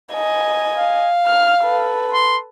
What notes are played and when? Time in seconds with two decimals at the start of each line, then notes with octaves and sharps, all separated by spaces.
0.12 D#5 G#5
0.75 F5
1.27 F6
1.63 A4 B4
2.13 C6